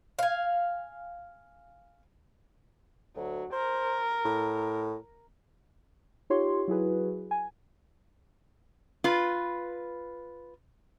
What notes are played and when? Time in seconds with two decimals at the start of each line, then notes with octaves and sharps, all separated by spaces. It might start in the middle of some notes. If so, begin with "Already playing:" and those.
0.19 F5 G#5
3.16 D2 F#3
3.53 A#4 C5
4.25 A2
6.30 D#4 F4 G4 C#5 C6
6.68 F#3 E4 F#4 G#4 B4
7.31 G#5
9.04 F4 B4